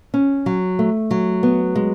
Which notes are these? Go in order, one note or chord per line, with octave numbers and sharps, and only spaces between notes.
C#4
F#3
A3
F#3
B3
G#3